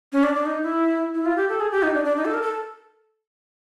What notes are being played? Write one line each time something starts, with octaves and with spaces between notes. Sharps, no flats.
C#4
D4
D4
D#4
E4
E4
F4
G4
A4
G#4
G4
D#4
D4
D4
D#4
A4
A#4
A4